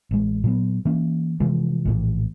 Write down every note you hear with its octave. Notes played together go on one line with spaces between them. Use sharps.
A1 G#3
A#2 F#3 B3
E3 A#3 C#4
C3 E3 F3 G#3
A#1 A2 E3